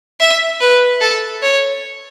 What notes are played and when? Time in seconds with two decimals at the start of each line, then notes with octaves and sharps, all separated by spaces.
0.20 E5
0.61 B4
1.01 A4
1.43 C#5